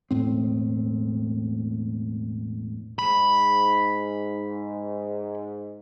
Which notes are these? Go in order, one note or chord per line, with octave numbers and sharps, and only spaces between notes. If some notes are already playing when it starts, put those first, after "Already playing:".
E1 A2 C4
G#2 B5